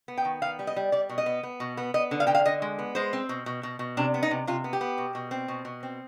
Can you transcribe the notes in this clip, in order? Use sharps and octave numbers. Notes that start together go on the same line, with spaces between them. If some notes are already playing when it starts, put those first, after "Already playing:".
B3
G5
D#3
B3 F5
G3
D#5
G3
G3 D5
B2
D#5
B3
B3
B2
B3
B3 D#5
D3
F5
D3 G5
F5
D3 D#5
G#3
B3
G#3 C5
C4
B2
B2
B2
B2
C3 D4
B3
D#4
C3
C3 F4
B3
G4
B3
B2
B2
C4
B2
B2
C4